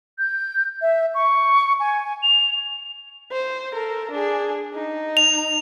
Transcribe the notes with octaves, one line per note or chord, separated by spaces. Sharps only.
G6
E5
C#6
G#5
F7
C5
A4 A#4
D4 G#4
D#4
F7